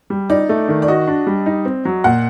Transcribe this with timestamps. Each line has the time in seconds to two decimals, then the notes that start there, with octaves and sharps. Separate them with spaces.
0.10 G3
0.30 D#4 D5
0.49 A3
0.68 D#3
0.82 D5
0.88 F#4 D#5
1.07 D4
1.27 G3
1.46 D#4
1.65 C4
1.85 F#3
2.04 A#2 F#5